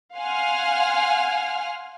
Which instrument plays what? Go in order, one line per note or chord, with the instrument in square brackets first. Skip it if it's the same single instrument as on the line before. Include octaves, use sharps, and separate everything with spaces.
[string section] F5 F#5 G#5 C6 F6